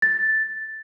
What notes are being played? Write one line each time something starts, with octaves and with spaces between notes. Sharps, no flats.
A6